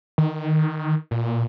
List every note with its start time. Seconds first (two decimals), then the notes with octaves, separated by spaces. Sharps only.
0.18 D#3
1.11 A#2